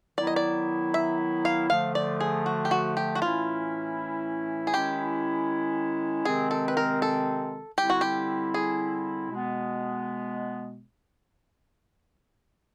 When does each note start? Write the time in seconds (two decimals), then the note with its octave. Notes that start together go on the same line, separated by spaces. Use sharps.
0.18 D#3 F#3 B3 E4 D5
0.27 D#5
0.36 D5
0.94 E5
1.45 F5
1.70 D3 F3 A3 F5
1.95 D5
2.20 G#4
2.46 F#4
2.65 G4
2.71 F#4
2.97 G4
3.15 F#4
3.22 A2 E3 A3 C#4 E4 F4
4.67 G#4
4.74 D#3 G#3 C#4 E4 G4
6.25 C3 D#3 G#3 C4 G#4
6.51 A4
6.68 B4
6.77 A#4
7.02 A4
7.78 D3 G3 C4 E4 G4
7.90 F#4
8.01 G4
8.54 G#4
9.30 B2 G#3 B3